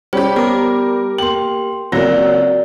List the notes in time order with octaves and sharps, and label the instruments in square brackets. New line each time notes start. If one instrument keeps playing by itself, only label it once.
[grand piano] G3 [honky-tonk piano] C#4 G4 [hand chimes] C5
[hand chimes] B3 [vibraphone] G4 [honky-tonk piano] A#4 D6
[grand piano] A#3 F#7 [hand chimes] G5 C6
[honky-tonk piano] C#2 F#3 [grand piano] A#3 A#6 [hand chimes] C4 [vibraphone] F#4 D5